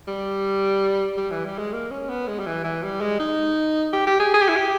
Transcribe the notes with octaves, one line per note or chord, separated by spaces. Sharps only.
G3
G3
E3
G3
G#3
A#3
C#4
B3
G#3
G3
E3
E3
G3
G#3
D#4
G4
G4
G#4
G#4
G4
E4
G4